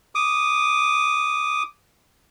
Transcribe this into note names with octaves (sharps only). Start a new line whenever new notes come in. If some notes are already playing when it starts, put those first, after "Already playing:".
D6 D#6